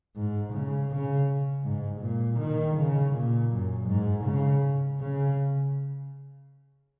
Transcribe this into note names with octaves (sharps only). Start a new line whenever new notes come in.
G#2
C#3
C#3
G#2
A#2
D#3
C#3
A#2
F#2
G#2
C#3
C#3